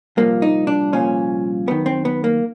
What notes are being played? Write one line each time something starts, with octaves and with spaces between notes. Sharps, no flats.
C2 A#2 F3 A#3
D#4
D4
C2 A#2 F3 C#4
F#2 D#3 B3
C4
B3
A#3